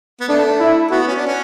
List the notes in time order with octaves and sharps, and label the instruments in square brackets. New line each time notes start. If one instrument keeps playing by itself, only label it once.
[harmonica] B3
[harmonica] A3 [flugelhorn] D4
[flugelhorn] E4
[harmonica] B3 [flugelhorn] F#4
[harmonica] C#4
D4
C#4